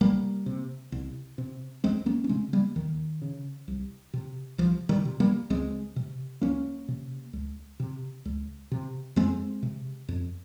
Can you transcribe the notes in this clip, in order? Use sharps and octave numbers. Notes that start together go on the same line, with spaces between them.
C2 G3 A#3
C3
C2
C3
D#2 G#3 C4
A#3 C#4
C#4
C#3 G#3 C4
G3 A#3
D#2 D#3
C#3
C2
C3
C2 F3
D#3 G3
C3
G3 A#3
C#2 G#3 C4
C3
C#2 A#3 C#4
C3
C#2
C3
C#2
C3
F2 G#3 C4
C3
F2